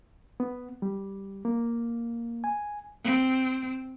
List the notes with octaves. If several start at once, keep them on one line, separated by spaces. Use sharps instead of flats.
B3
G3
A#3
G#5
C4